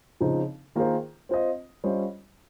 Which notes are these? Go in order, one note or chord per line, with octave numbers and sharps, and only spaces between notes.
C#3 F3 C4 D#4
D#3 A#3 F4 G#4 C5
C4 F4 C5 D#5
G3 C#4 F4 C5 D#5